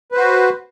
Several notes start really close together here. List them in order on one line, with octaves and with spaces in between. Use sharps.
B4 C5 F#4